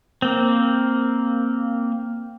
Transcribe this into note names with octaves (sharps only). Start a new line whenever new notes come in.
A#3 C4